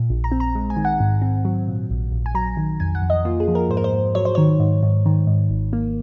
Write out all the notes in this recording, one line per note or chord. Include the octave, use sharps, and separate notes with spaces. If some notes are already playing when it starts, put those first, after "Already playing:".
Already playing: A#2
A#1
A#5
C4
A#5
G#3
G#5
D#3
F#5
G#2
C4
F#3
A#2
A#1
A#1
G#5
F#3 A#5
D#3
F2 G#5
F#5
F2
D#5
A#3 F4
G#4
F3
A#4
G#2 C5
A#4
C5
G#2
F#3 C#5
C5
D#3 C#5
G#2
G#2
D#3
G#2
G#1
A#3